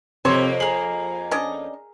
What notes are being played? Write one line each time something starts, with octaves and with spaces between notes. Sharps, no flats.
F2 C3 A#3 C5 C#5
G#4 A#4 F#7
C#4 D4 D#5